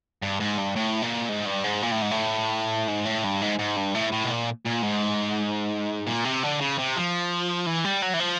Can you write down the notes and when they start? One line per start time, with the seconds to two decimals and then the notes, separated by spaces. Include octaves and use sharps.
0.23 G2
0.40 G#2
0.58 G2
0.76 A2
1.02 A#2
1.29 G#2
1.46 G2
1.64 G#2
1.82 A#2
1.91 A2
2.02 G#2
2.11 A2
2.88 G#2
3.06 A2
3.24 G2
3.41 G#2
3.59 G#2
3.76 G2
3.94 A2
4.12 A2
4.24 B2
4.30 A#2
4.66 A#2
4.83 G#2
6.07 A#2
6.25 C3
6.43 D3
6.60 C#3
6.78 C3
6.96 F3
7.66 E3
7.84 G3
8.02 F#3
8.13 E3
8.20 F3